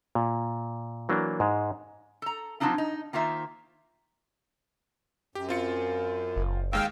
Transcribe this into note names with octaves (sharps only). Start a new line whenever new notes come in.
A#2
E3 F#3 A#3 D4
G#2 G#3
A4 A#5
F3 F#3 C4 D4 D#4 F4
D#4
D#3 A#3 F4 C5 E5
F#2 G4
C4 F4 C#7
F#1
D#2 G#3 F5 G5 E6 F6